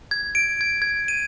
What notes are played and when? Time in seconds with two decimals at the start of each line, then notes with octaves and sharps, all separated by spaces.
0.11 G#6
0.35 D7
0.61 G#6
0.82 G#6
1.08 D#7